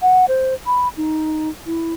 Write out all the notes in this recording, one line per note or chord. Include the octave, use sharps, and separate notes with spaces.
F#5
C5
B5
D#4
E4